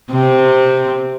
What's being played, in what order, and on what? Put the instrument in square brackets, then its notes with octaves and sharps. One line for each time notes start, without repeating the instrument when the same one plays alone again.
[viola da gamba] C3 C4